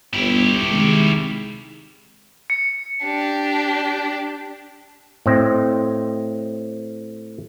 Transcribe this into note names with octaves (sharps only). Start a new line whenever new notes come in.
G1 E4 G4
C3 D#3 G#3
C#7
D4 G4
A2 C4 D#5